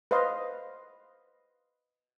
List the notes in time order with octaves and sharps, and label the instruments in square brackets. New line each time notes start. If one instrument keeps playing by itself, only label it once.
[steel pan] B4 C5 D#5 F5 C6